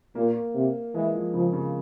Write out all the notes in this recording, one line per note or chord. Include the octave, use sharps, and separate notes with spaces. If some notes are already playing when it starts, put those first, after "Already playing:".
A#2 A#3
C3
E3 G#3
F3
C#3 F3
C#3